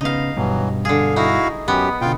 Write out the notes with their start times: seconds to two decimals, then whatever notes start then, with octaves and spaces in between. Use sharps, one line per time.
0.01 C#3 B3 D#4 F5
0.37 G2 B2 E3 F#3
0.85 D3 G#4 F5
1.16 D#4 E4 F#4 F5
1.68 F#2 B3 G4
2.01 B2 D3 F4 G5